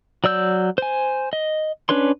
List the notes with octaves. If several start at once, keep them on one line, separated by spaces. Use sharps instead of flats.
F#3 D5 E6 G6
C5 G#5
D#5
C#4 D4 B4 C#5 C6